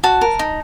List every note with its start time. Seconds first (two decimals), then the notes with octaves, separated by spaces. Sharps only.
0.03 F#4 A5
0.21 A#4
0.39 D#4